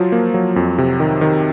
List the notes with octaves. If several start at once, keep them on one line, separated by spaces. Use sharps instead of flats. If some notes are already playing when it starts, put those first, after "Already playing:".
Already playing: F3 F#3 F4
A#3
F#3
F2
C3
D#3
D#3